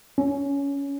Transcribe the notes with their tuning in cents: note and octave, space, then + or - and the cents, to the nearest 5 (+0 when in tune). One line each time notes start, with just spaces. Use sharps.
C#4 +15